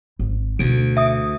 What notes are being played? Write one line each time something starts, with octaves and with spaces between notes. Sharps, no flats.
G#1
D2 B2 D7
E5 D#6